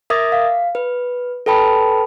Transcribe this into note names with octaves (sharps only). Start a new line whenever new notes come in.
A#4 E5 D6 D#6 G#6 A6
F5
B4
A4 B4 G5 A5 B5